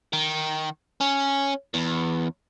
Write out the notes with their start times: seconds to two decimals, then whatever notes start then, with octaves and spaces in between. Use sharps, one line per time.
0.13 D#3
1.01 C#4
1.74 E2